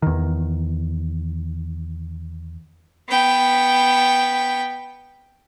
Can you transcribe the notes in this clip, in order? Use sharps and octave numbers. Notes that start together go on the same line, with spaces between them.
E2 D#3
B3 G5